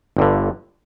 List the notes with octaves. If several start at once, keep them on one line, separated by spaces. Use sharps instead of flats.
G1 G2 D3